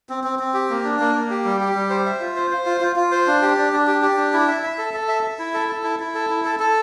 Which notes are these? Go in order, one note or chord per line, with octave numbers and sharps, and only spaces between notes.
C4
C4
C4
G4
A#3
D4
A#3
A#3
G4
G3
G4
G3
C5
E5
F4
C5
C5
F4
F4
F4
C5
D4
G4
D4
D4
G4
G4
D4
E4
E5
E5
A4
A4
E5
E5
E4
A4
A4
E4
E4
A4
E4
A4
A4